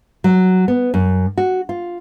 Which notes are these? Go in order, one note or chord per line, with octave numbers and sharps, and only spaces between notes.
F#3
B3
F#2
F#4
F4